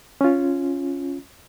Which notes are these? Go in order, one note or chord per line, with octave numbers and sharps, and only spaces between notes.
C#4 F4